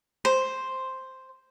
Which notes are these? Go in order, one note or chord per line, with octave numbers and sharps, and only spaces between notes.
C5